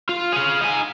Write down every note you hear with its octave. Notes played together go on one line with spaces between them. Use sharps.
F4
G#4 F5
D#4 G#5